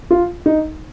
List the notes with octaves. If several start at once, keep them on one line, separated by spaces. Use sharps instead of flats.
F4
D#4